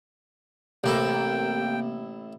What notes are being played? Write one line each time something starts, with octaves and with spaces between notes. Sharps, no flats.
A1 C3 A#3 E4 A4 G5